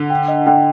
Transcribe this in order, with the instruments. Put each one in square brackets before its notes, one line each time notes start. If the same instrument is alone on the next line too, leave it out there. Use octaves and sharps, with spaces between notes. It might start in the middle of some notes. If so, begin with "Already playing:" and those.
Already playing: [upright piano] D3
[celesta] G5
D#5
[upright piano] D3 [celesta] G5